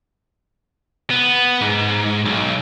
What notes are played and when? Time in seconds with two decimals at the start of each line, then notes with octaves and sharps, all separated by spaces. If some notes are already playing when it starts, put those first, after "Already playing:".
1.10 B3
1.61 G#2
2.25 B1